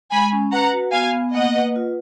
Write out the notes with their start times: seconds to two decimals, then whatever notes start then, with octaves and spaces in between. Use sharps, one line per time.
0.12 G#3 G#5 B5
0.32 C#4
0.53 B4 F#5 A#5
0.73 F#4
0.93 B3 F5 G#5
1.13 B3
1.34 A#3 D#5 F#5
1.55 B4
1.76 F4